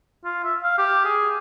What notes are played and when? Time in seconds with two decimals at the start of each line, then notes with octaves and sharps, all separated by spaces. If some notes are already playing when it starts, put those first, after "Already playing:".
0.25 F4
0.44 E5
0.63 F5
0.78 G4
1.05 G#4